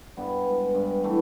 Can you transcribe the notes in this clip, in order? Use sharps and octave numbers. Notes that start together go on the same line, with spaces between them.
G2 B3
G#3
G2
E3 A3